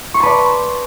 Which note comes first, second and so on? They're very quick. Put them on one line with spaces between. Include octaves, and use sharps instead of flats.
C#6 C6 A5 B4 D5